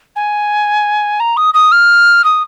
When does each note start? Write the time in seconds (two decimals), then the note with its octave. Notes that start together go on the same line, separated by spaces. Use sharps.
0.15 G#5
1.20 A#5
1.36 D#6
1.54 D#6
1.71 F6
2.24 D#6